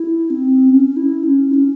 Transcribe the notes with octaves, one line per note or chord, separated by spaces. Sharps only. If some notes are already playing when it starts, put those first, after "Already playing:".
Already playing: E4
C4
C#4
E4
C#4
E4
C#4